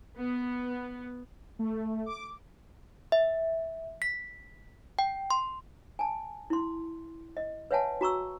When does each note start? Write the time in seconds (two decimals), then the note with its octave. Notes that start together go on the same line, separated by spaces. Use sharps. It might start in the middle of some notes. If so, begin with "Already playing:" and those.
0.17 B3
1.59 A3
2.06 D6
3.12 E5
4.02 B6
4.99 G5
5.31 C6
5.99 G#5 A5
6.50 E4 C6
7.37 D#5
7.71 B4 C#5 E5 F#5 G#5 A5
8.01 F#4 A#5 C#6 E6